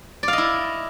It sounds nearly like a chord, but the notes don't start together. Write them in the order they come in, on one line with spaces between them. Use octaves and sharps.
D5 F5 D#5 E4